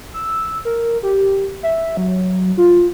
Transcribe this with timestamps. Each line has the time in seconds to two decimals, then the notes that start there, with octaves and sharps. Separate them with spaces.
0.14 E6
0.65 A#4
1.03 G4
1.63 E5
1.97 F#3
2.57 F4